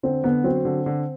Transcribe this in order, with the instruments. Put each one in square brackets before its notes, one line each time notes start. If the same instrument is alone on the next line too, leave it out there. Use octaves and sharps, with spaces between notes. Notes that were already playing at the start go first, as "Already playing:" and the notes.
[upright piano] D3 [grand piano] C4
[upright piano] D3 [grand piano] B3
[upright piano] F#3 [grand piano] C4
[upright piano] D3
D3